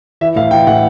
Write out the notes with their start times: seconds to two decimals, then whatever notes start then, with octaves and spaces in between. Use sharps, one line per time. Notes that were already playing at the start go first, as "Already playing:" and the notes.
0.21 E3 E5
0.36 A2 F5
0.51 E3 G5
0.67 A2 F#5